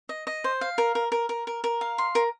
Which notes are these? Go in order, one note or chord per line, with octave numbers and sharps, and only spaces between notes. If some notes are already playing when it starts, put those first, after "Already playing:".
D#5
D#5
C5
F5
A#4
A#4
A#4
A#4
A#4
A#4
F5
C6
A#4